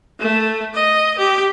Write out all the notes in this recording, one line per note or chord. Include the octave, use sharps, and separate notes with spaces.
A3
D#5
G4